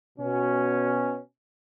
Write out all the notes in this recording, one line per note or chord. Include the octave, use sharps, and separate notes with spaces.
B2 C#4